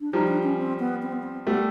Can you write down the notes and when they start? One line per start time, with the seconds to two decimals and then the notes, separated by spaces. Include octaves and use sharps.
0.01 D4
0.13 F3 G3 D#4
0.28 D4
0.43 C#4
0.58 C4
0.79 B3
1.02 C4
1.12 B3
1.23 C4
1.46 G3 A3 B3